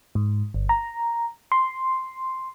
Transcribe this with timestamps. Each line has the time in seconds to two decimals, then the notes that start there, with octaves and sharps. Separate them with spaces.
0.15 G#2
0.54 G1
0.69 A#5
1.52 C6